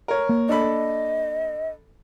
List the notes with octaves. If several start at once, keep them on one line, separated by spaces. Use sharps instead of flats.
A#4 C#5
A#3
D4 A4 D#5 B5